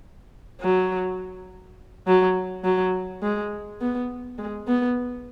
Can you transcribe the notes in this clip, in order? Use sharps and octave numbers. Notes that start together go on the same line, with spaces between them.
F#3
F#3
F#3
G#3
B3
G#3
B3